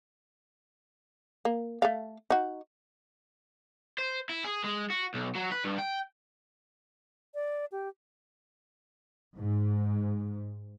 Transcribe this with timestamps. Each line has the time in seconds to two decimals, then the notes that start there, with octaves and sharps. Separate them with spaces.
1.45 A#3
1.82 A3 A4 F5
2.30 D#4 F#4
3.99 C5
4.29 E4
4.45 G#4
4.64 G#3
4.90 F#4
5.14 B1
5.35 F#3
5.51 B4
5.64 G2
5.78 G5
7.34 D5
7.72 G4
9.38 G#2